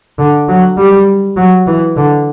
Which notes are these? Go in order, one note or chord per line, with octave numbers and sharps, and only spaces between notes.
D3
F#3
G3
F#3
E3
D3